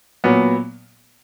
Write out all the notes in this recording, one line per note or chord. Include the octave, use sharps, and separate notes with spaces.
A#2 F#3 B3